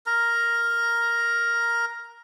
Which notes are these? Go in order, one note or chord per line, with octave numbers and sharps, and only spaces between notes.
A#4 A#5